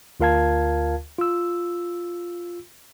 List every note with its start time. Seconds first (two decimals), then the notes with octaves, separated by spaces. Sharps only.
0.20 D2 F4 A#4 F5 A5 G#6
1.18 F4 E6